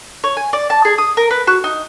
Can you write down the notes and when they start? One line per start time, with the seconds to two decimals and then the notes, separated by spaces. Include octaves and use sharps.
0.24 C#5
0.37 G#5
0.53 D5
0.70 A5
0.85 G#4
0.98 D#6
1.17 A#4
1.31 B4
1.47 F#4
1.64 D#4